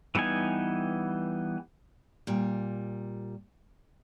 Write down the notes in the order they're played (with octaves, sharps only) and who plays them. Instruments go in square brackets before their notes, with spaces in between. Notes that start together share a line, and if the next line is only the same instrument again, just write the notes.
[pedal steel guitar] E3 G3 B3 D#4 G#5
[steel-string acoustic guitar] A#2 G3